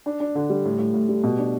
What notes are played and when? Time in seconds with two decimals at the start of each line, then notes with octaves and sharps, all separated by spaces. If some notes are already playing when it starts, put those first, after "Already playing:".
0.06 D4
0.20 D4
0.35 D3
0.50 G3
0.65 A2
0.79 A2
0.94 A2
1.09 G3
1.24 B2
1.38 D4